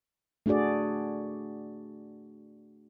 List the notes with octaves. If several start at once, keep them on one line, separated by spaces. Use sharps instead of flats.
A3 D4 F#4 G#4 D5